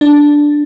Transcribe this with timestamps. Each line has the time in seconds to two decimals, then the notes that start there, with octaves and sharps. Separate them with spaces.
0.01 D4